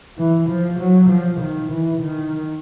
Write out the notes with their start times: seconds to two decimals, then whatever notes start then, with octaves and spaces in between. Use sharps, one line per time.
0.18 E3
0.49 F3
0.80 F#3
1.10 F3
1.41 D#3
1.72 E3
2.02 D#3